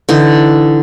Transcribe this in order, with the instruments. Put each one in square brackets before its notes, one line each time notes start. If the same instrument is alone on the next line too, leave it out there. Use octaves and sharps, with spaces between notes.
[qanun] D3 E3 D#4